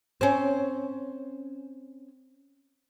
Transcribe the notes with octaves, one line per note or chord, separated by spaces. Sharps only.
C4 C#4